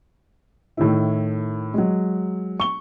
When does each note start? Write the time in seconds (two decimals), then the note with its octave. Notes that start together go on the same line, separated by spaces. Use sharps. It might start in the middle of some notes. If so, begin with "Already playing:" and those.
0.77 A2 D#3 E4
1.74 F#3 G#3
2.60 C#6 G7